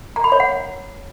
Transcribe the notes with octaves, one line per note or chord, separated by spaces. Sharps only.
A#5
B5
C#5
F#5